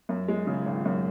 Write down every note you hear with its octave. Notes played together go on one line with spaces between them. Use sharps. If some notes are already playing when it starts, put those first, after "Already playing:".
F#2
G#3
C#3
G#1
F#2